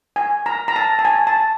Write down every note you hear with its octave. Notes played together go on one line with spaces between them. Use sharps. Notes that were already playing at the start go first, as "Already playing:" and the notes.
G#5
A#5
A#5
A5
A5
G#5
A5